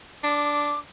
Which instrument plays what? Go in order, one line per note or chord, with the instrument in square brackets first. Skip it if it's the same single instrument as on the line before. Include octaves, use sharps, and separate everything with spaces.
[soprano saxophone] D4 [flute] D6